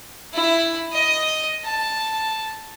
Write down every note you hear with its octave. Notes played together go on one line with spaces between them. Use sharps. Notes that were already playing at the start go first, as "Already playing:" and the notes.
E4
D#5
A5